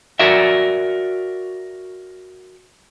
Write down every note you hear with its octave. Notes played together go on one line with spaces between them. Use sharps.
F#4 A#4 D5 E5